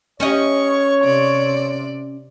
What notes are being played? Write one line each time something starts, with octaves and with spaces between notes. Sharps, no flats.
C#4 G4 C#5 D#5 C#6
C3 D5